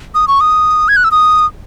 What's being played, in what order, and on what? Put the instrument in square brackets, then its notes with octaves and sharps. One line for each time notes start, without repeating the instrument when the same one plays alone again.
[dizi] D#6
C#6
D#6
G#6
F#6
E6
D#6